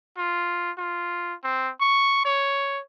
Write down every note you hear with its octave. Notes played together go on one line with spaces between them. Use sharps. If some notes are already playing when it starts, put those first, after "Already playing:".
F4
F4
C4
C#6
C#5